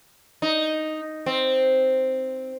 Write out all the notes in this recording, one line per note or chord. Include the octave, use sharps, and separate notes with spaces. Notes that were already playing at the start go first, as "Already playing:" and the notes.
D#4
C4